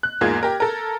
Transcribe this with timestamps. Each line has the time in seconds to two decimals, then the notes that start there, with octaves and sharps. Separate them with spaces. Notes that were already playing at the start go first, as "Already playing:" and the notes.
0.03 F#6
0.21 E2 G#2 A#3 F4 G#4 G#6
0.43 G4 A#4
0.60 A4 A#4